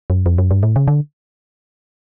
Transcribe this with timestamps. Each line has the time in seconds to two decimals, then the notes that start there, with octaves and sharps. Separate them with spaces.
0.10 F#2
0.26 F2
0.38 F#2
0.51 G2
0.63 A2
0.76 C#3
0.88 D3